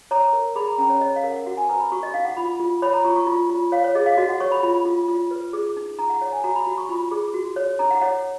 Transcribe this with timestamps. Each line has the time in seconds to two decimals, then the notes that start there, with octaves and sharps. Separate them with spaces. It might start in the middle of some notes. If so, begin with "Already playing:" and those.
0.11 C#5 A#5
0.33 A#4
0.55 G#4 B5
0.67 A#5
0.78 C#4 A#5
0.90 C#5
1.01 C#5 D#5
1.16 F5
1.24 A#4
1.31 F#5
1.46 F#4 F#5
1.57 G#5
1.69 B4 A#5
1.80 B5
1.92 F#4 C#6
2.03 D#5
2.14 D#4 F5
2.25 F#5
2.37 F4 B5
2.60 F4
2.82 C#5 B5
2.93 A#5
3.05 F4 C#6
3.16 C#6
3.27 F4
3.50 F4
3.72 C#5 F5
3.84 C#5
3.95 G#4 D#5
4.06 F5
4.17 F#4 D#5
4.29 F#5
4.40 C#5 C#6
4.52 B5
4.63 F4 B5
4.85 F4
5.08 F4
5.31 B4
5.53 G#4
5.77 D#4
5.99 D#4 A#5
6.10 F#5
6.21 C#5 F#5
6.32 G#5
6.44 F#4 A#5
6.55 B5
6.67 F#4 B5
6.78 C#6
6.89 F4 B5
7.11 G#4
7.34 F#4
7.56 C#5
7.79 D#4 A#5
7.91 F#5
8.02 C#5 F#5